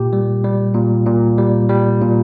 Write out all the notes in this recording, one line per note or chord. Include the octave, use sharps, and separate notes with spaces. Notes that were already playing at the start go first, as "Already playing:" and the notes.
Already playing: A#2 G4
G3
G3
A#2
A#2
G3
G3
A#2